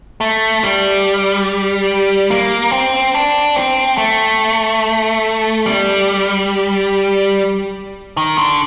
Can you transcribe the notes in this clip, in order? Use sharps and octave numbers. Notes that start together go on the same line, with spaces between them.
A3
G3
A#3
C4
D4
C4
A3
G3
D#3
D3